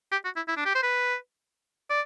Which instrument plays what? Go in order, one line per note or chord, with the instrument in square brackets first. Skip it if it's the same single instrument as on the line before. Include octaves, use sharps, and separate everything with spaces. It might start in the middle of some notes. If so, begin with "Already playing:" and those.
[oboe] G4
F#4
E4
E4
D4
G4
C5
B4
D5